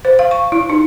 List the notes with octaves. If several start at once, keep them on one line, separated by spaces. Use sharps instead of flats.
C5
F5
C#6
E4
D#4